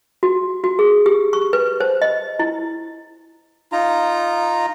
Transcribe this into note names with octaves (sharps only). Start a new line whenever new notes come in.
F#4
F#4
G#4
G4
C#6
B4
C5
D#5
E4
D#4 F4 A#5